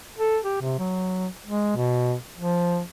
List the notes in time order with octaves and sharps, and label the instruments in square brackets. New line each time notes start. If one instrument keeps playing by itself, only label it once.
[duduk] A4
G4
C3
F#3
G#3
B2
F3